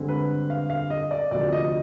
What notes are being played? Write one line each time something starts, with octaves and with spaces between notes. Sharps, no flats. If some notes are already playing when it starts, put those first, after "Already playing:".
Already playing: G2 D3 G#3 C4
B4
F5
F5
D#5
D5
D2 C3 F3 D5
D#5